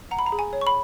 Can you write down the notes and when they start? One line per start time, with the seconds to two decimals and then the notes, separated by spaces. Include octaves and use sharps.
0.11 F#5 A#5
0.19 B5
0.26 A#5
0.32 G#4
0.39 G#5
0.53 C#5
0.61 C#6
0.67 B5